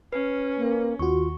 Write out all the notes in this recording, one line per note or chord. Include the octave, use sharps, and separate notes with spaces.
C#4 B4
A#3
D#2 F4 F#4 C#6